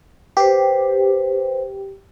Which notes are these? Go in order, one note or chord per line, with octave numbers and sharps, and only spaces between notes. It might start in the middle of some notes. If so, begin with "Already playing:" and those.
G4 B4 C5